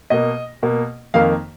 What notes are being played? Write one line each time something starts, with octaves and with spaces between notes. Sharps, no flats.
B2 A#3 D#5
B2 A#3
F2 D#3 A#3 F5